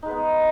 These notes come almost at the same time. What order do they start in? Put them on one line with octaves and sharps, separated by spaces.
D#4 G#3 B4 B3